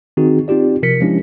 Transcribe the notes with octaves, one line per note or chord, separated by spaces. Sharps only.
D#3 C4 D#4 F#4 G#4
C4 D#4 F4 G4 D5
C3 F3 A#4 B6 C#7
F3 G#3 C#4 D4 E4 G4